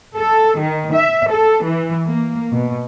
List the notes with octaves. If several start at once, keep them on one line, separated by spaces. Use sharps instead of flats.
A4
D#3
E5
A4
E3
A#3
B2